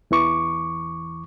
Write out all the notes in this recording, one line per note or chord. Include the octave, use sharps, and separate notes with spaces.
E2 E3 C#6 D6